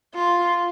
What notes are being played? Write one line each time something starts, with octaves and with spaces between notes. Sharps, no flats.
F4